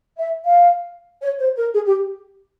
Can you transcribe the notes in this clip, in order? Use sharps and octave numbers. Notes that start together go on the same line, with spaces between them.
E5
F5
C#5
C5
A#4
G#4
G4